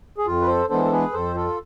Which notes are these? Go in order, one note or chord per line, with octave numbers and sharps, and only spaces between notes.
G#4
F2 F4
B4
A4 C5
E3 G#3 B3 D4 A4 C5
A4
G#4 B4
F2 A4 C5
F4 A4